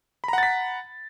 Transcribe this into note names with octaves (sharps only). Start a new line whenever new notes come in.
F#5 A#5 B5 A6 B6